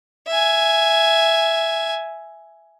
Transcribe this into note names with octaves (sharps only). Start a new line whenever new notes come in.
E5 G#5